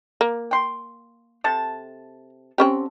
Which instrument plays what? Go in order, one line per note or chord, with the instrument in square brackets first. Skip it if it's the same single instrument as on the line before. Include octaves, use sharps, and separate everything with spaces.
[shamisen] A#3
[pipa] G5 C6
C3 A4 A5
[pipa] D3 [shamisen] C4 C#4 G4